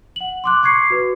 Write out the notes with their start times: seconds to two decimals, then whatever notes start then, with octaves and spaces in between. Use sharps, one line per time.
0.16 F#5 F#7
0.44 C6 D6 F#6
0.63 C#6 D6 G#6 C7 C#7
0.90 F#4 B4